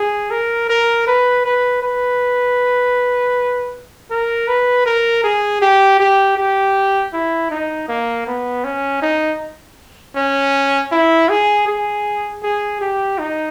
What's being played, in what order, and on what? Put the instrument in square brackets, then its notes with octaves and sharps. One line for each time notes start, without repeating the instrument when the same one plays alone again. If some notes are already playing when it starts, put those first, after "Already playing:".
Already playing: [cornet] G#4
A#4
A#4
B4
B4
B4
A#4
B4
A#4
G#4
G4
G4
G4
E4
D#4
A#3
B3
C#4
D#4
C#4
E4
G#4
G#4
G#4
G4
D#4